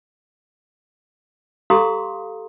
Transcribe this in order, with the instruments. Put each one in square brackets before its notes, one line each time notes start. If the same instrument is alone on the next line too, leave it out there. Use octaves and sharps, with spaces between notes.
[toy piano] G4 A4 F5 A#5 C6 D#6